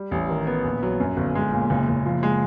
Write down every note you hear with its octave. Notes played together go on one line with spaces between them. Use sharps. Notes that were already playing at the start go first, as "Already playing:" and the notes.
Already playing: G3
A1
D#3
B3
A#1
F#3
F#2
G1
G#3
A#2
F#1
F#1
F3
G#3